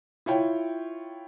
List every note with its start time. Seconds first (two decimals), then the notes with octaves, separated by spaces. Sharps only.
0.26 E4 F4 C#5 G5